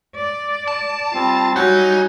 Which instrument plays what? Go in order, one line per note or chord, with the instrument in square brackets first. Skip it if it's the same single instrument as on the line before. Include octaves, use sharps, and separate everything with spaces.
[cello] D5
[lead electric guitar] A5
[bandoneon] G3 C4 [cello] F4
[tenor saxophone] F#3 [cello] G3 [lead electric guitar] D#4 [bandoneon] G#5